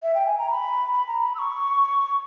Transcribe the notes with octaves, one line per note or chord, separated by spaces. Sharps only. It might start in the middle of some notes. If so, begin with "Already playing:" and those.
E5
G5
G#5
A#5
B5
B5
A#5
B5
E6
C#6